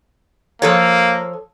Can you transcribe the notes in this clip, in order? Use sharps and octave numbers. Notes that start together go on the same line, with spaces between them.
F3 A#3 A4 C#5